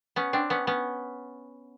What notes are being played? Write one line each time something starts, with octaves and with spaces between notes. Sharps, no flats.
B3 C#4
C4 D4
B3 C#4
B3 C#4